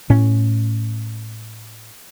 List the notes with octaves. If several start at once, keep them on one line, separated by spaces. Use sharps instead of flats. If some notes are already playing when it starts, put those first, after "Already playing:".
A2 C#4